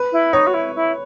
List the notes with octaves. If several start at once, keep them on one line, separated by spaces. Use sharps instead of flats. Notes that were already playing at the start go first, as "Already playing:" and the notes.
Already playing: B4
E4
D#4 C#5
F#4
E4
E4